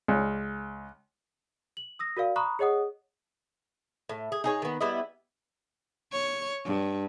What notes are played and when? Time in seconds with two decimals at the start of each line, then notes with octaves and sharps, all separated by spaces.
0.08 C#2
1.77 F#7
1.99 D#6 E6 A#6
2.17 F#4 A#4 D5 F5
2.36 A#5 B5 C#6 D#6 F#6
2.59 G#4 C#5 D#5 F#5 D#6
4.09 A2
4.32 G#4
4.44 D#4 G#4 C#5
4.62 D#3 B3
4.81 G3 B3 E4 D#5
6.12 C#5
6.65 G2